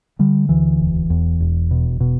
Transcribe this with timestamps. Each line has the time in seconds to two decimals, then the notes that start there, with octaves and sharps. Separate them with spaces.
0.19 D3 G3
0.49 D2 E3
0.80 E1
1.10 E2
1.40 E1
1.71 B2
2.00 B2